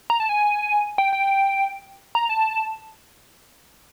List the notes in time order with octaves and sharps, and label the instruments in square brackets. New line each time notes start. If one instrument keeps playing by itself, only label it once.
[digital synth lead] A#5
A5
G#5
G5
G5
A#5
A5